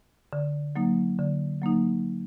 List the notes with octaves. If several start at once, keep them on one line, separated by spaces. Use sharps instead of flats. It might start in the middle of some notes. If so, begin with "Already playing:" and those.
D3
F#3 A#3 D#4
D3
F#3 A#3 D#4